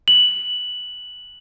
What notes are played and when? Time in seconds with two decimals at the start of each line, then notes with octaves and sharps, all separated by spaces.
0.08 F#7